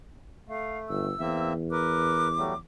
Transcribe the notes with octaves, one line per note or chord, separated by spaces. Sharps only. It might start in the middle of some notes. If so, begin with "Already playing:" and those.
A3 F5
G1 E6
E2 A#3 C4 E5
A#4 B4 D6
F#3 G3 A3